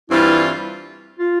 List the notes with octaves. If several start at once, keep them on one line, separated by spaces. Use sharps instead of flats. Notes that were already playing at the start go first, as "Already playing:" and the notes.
G2 E3 G3 C4 E4 F4
F4